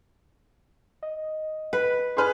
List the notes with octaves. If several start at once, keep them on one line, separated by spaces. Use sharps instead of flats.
D#5
B4
G#4 B4 C6 F6 F#6